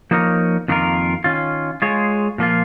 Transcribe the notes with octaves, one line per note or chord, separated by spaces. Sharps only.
F3 A#3 D#4 A#4 C#5
F2 D#3 A#3 F4 A#4
D#3 C#4 F4
G#3 F4 G#4 C#5
A#2 F3 A#3 F4